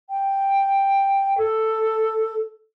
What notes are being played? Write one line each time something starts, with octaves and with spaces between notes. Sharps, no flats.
G5
A4